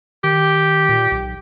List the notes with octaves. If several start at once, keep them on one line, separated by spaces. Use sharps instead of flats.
D#3 G4
A#2
B1